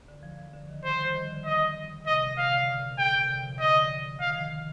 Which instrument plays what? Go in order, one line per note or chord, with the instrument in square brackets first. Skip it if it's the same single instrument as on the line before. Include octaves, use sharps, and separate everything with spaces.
[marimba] D3
F3
F3
D3
D#3
[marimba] F3 [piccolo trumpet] C5
[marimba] G3
D#3
D3
[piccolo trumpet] D#5
[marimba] C3 [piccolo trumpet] D#5
[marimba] A#2
[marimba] C3 [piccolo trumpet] F5
[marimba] D3
A#2
[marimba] A2 [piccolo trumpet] G5
[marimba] A#2
C3
D3
F3
[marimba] D3 [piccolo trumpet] D#5
[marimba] D3
[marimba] D#3 [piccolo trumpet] F5
[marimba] D#3
F3